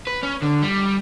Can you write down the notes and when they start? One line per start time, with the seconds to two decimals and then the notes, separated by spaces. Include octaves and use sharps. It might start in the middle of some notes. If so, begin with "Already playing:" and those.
0.07 B4
0.23 C#4
0.42 D3
0.62 G3